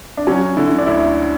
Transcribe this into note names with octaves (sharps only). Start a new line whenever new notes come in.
D4
F#3 C#4
D3 E4
D4
D2 E4